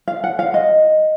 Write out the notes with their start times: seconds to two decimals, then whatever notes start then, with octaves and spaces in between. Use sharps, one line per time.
0.08 F5
0.24 F#5
0.39 F5
0.54 D#5